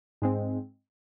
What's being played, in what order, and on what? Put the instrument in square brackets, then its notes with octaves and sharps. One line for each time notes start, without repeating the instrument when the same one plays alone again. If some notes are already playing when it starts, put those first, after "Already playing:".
[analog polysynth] G#2 G#3 C4